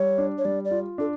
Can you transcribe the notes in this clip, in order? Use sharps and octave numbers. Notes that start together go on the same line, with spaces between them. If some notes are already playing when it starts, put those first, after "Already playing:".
Already playing: G3 C#5
D4
C#5
G3 D5
D5
F4
D4 A4